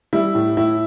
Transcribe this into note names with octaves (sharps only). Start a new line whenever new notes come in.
G3 E4
A2
A2 E4